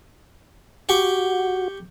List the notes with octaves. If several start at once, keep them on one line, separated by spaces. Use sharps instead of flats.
F#4 G4 G5 C#6